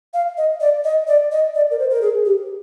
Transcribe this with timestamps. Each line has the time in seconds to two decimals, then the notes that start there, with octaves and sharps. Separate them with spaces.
0.14 F5
0.37 D#5
0.61 D5
0.84 D#5
1.07 D5
1.32 D#5
1.55 D5
1.71 A#4
1.79 C5
1.90 A#4
2.01 G#4
2.25 G4